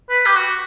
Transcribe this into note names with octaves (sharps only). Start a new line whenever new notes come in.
B4
G4
F#4